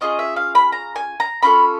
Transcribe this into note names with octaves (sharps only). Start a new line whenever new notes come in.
C#4 F4 G#4 D#5
E5
F5
B5
A#5
G#5
A#5
C#4 F4 A4 B5